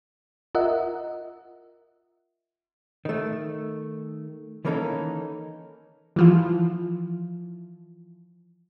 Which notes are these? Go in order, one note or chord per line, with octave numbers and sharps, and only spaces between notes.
F4 A#4 D#5 E5 F#5
D#3 A3
D#3 E3 A#3 C#4 D#4 A4
E3 F3 F4